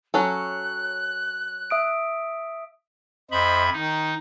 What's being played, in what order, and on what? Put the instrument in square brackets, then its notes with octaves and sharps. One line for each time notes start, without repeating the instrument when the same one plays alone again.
[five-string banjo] F#3 C#4 A4 [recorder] F#6
[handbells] E5 D#6 D7
[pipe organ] F2 E5 B5 [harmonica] C5 D#5
[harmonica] D#3 [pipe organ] D#4